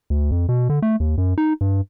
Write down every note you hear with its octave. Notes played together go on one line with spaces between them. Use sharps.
D2
F2
B2
D3
A3
D#2
F#2
D#4
G2